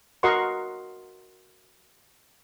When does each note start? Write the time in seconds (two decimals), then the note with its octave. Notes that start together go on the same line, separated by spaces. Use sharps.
0.23 F#4 A#4 D#5 F#5 C6 C#6